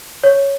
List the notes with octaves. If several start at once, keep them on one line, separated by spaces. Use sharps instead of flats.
C#5